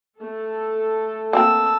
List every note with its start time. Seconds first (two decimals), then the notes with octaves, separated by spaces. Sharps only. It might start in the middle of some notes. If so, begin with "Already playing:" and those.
0.21 A3 A4
1.33 A#3 C4 A#4 A5 E6